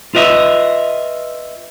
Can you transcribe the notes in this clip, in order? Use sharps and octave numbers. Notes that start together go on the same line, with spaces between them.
F4 B4 D#5 E5